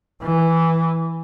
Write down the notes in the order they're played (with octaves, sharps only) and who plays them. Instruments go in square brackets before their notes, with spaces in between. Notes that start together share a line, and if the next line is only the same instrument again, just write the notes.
[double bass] E3